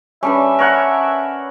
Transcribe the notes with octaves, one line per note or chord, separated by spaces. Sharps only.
G3 C#4 D4 B4 E5
A#4 C#5 F#5